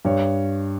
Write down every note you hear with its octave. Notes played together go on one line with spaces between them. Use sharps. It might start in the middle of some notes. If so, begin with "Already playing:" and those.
G2 C#5